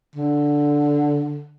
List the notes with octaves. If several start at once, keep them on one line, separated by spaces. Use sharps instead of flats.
D3